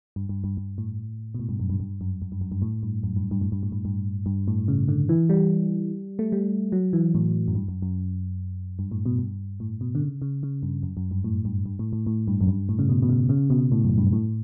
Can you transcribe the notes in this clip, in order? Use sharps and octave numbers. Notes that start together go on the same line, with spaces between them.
G2
G2
G2
G2
A2
B2
A2
G2
F#2
G2
G2
F#2
F#2
G2
F#2
G2
A2
G2
F#2
G2
G2
A2
G2
A2
G2
G2
G2
A2
C#3
D3
E3
G3
A3
G3
F#3
E3
A2
F#2
G2
F#2
F#2
G2
A2
B2
G2
A2
B2
D3
C#3
C#3
C#3
G2
F#2
F#2
G2
A2
G2
G2
A2
A2
A2
G2
F#2
G2
A2
C#3
B2
B2
C#3
C#3
B2
A2
F#2
G2
A2